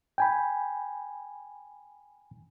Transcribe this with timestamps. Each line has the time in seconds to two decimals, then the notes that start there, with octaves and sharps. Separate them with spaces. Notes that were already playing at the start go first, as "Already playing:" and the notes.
0.18 G5 G#5 B5